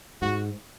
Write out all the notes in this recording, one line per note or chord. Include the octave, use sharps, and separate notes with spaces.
G#2 F#4